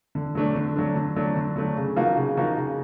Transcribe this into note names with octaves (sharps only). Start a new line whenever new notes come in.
D3
F#3 A3 D4
D3
F#3 A3 D4
D3
F#3 A3 D4
D3
F#3 A3 D4
C#3
F3 A#3 D#4 F#4
C#3
F3 A#3 D#4 F#4
C#3